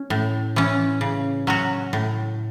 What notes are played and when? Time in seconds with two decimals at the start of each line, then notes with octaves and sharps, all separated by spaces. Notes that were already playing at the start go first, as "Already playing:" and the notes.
Already playing: C#4
0.10 A2
0.56 E3 C#4
1.01 C#3
1.47 F#3 C#4 F#4
1.93 A2